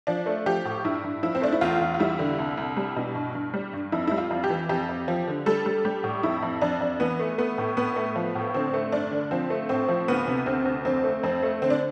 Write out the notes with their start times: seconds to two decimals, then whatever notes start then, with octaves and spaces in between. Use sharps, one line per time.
0.07 F3 D4
0.26 A3
0.46 F3 G4
0.65 A2
0.84 G2 E4
1.04 G2
1.23 F3 E4
1.35 C4
1.42 A3 D4
1.53 E4
1.61 E2 F4
1.81 E2
1.94 F4
2.00 G3 E4
2.19 D3
2.38 C2
2.57 C2
2.77 G3
2.96 B2
3.15 G2
3.35 G2
3.54 G3
3.73 G2
3.92 F2 E4
4.07 G3 E4
4.18 F4
4.30 F2
4.44 G4
4.50 E3
4.69 F2 G4
4.89 F2
5.08 F3
5.28 D3
5.46 G3 A4
5.66 G3
5.85 G3 G4
6.04 A2
6.23 F2 E4
6.42 F2
6.61 F2 D4
6.81 F2
7.00 E3 B3
7.20 A3
7.38 A3 B3
7.58 A2
7.77 A2 B3
7.96 A3
8.16 F3
8.35 A2
8.54 D3 C4
8.74 A3
8.92 G2 D4
9.12 D3
9.31 F3 C4
9.50 A3
9.69 A2 C4
9.88 F3
10.08 D2 B3
10.27 C3
10.46 D2 C4
10.65 D2
10.85 F2 C4
11.04 A3
11.23 F2 C4
11.43 A3
11.62 D3 C4
11.70 D4